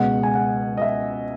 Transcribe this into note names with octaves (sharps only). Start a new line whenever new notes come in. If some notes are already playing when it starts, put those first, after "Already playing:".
Already playing: C#2 B2 G#3 F#5
G#5
F#5
D#5
E5